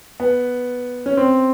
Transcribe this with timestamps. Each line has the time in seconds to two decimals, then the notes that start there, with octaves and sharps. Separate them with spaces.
0.20 B3
1.06 C#4
1.17 C4